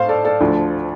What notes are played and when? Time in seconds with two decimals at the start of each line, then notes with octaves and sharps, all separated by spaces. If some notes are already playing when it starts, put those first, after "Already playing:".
Already playing: A2 A3 C5 F5 A5 C6
0.09 A4 D5
0.25 A4 D5
0.40 D2 D3 F3